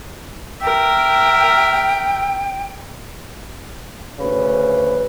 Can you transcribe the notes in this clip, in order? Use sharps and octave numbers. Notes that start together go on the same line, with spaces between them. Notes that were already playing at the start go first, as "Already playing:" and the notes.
A#4 E5 G5
D2 C#3 B4